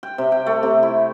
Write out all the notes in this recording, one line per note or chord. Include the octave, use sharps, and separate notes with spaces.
G5
C3
G5
A3
C3
E4